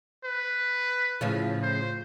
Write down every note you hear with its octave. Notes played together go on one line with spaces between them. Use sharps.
B4
A2 C#3 F3
C5